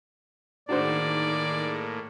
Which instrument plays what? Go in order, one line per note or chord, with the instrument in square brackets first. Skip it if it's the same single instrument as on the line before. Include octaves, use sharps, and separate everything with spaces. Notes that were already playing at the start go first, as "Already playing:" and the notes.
[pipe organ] A2 A#3 [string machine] D#3 G#4 [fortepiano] D4 F#4 C5 [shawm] D5